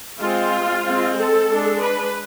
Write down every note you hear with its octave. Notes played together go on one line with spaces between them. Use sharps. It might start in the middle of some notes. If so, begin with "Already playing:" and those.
G#3 C4 F4
G#3 C4
A4
G#3 D4
B4